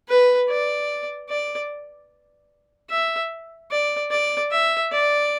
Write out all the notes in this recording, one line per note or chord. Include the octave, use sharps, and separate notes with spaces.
B4
D5
D5
E5
D5
D5
E5
D5